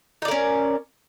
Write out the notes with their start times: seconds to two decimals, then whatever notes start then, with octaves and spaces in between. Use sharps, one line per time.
0.22 D#4
0.25 D5
0.28 A#4
0.31 C#4